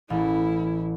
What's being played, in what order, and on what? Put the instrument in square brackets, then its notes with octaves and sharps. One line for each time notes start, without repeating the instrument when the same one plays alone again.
[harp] A1 [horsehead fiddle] E4